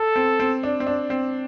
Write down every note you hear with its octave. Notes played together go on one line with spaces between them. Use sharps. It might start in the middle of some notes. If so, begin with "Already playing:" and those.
Already playing: A4
C4
C4
D4
C4
D4
C4